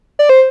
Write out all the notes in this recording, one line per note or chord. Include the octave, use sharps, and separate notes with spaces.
D5
C5